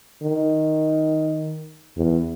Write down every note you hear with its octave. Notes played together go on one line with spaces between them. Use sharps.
D#3
E2